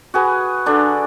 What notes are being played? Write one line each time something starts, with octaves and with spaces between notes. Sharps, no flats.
F#4 G#4 B4
D3 D4